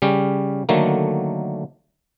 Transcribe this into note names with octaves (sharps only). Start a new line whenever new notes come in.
C#3 G3 C#4 G4
D3 D#3 F#3 A3 A#3